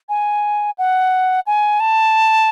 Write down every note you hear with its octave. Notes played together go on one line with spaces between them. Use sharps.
G#5
F#5
G#5
A5